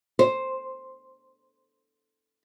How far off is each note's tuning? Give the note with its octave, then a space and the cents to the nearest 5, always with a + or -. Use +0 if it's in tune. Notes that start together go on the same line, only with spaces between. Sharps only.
C5 +5